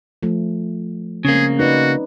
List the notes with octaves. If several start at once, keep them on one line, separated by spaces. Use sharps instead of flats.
F3 A3
C#3 G#3 A#3 C4 C#4 G#4
D#4 F#4 B4 D5